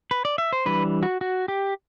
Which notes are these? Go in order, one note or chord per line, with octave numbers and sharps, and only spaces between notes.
B4
D5
E5
C5
E3 G3 D4 B4
F#4
F#4
G4